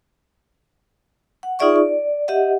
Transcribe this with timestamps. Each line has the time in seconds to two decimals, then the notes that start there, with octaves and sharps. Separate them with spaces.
1.43 F#5
1.59 D#4 F4 G#4 D5 E5 C#6
1.76 D5
2.28 G4 D#5 E5 F#5